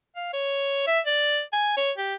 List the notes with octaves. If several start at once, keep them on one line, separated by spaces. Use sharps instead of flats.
F5
C#5
E5
D5
G#5
C#5
G4